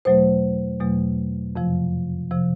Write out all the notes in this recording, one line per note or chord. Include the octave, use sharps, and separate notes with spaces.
E2 B2 F#3 A3 C5
E2 B2 F#3 A3
F2 C3 F3
C3 F3